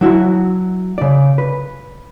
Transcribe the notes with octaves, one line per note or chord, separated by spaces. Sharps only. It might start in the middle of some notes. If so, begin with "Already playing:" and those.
F#3 E4 F#4
C#3 D5
B4